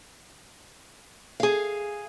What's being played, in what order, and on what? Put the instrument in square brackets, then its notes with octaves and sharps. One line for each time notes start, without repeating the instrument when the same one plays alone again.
[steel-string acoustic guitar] G#4 F5